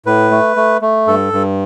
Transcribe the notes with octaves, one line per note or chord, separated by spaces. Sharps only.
A2 B4
A3
A3
A3
G2 A4
G2